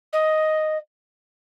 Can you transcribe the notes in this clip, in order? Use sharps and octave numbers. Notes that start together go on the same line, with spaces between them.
D#5